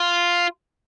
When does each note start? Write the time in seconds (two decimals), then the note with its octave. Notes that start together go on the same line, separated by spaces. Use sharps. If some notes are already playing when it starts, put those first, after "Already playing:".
Already playing: F4